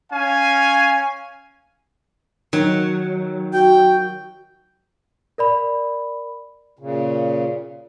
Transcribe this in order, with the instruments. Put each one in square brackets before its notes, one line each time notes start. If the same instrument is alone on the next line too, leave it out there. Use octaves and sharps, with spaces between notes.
[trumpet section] C#4 F5 G#5
[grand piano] D#3 [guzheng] F#3
[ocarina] F#4 [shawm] G5
[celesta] A#4 D5 B5
[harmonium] A#2 C#3